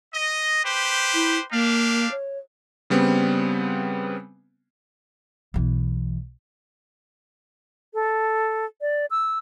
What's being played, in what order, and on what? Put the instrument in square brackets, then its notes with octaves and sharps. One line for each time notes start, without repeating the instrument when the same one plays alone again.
[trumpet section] D#5
G4 B4 C5
[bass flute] E4
[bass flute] A#3 [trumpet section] D4 G4 F5
[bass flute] C#5
[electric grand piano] C#3 G3 B3 C4
[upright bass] B1 E3
[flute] A4
D5
E6